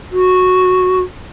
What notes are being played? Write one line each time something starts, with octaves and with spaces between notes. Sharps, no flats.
F#4